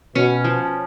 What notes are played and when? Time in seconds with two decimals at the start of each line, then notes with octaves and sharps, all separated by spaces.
0.15 B2 C#4
0.44 F3